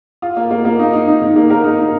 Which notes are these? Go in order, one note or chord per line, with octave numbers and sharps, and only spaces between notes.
F4
A#3
A#3
A#3
D#4
D#4
D#4
D#3
A#3
A#4
D#4
D#4